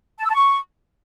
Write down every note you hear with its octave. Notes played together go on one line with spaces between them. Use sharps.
A5
E6
A5
C#6